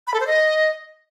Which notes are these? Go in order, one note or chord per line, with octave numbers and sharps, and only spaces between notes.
B5
A4
C5
D#5